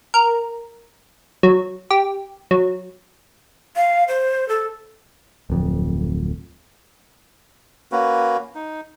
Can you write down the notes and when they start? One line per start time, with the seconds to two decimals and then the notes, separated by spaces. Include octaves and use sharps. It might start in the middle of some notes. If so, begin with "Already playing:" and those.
0.14 A#4
1.43 F#3
1.91 G4
2.51 F#3
3.76 F5
4.08 C5
4.49 A4
5.50 D1 F2
7.92 A#3 C#4 F#4 B4
8.55 D#4